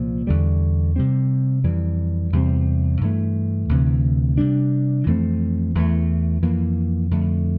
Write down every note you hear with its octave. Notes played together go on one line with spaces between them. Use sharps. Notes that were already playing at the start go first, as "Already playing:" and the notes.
Already playing: C2 A#2 F3
E2 D3 G3
C3 G3 C4
F2 E3 G3
E2 C3 G3 C4
G2 E3 A3
D2 C3 E3
C3 G3 D4
F2 E3 A3 C4
E2 E3 A3
F2 E3 A#3
F2 D3 A3